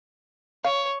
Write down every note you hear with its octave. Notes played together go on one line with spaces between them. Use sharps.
C#5 F5